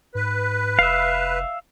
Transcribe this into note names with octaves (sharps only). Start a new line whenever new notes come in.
G#2 B4
F1 E5 F5